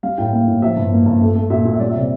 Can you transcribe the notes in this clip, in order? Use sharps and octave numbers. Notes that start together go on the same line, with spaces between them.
G3 F5
A2 G5
A#3 F5
A2
F3 E5
G2
A#3
G2
A3
A3
A#2 E5
A#2
E5
G3 D5
E5
C3 D5